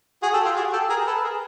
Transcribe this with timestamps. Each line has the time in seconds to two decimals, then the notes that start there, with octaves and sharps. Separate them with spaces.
0.22 F#4 G#4
0.33 G4 A4
0.45 F4 G4
0.56 F#4 G#4
0.73 G4 A4
0.90 G#4 A#4
1.07 A4 B4
1.24 G#4 A#4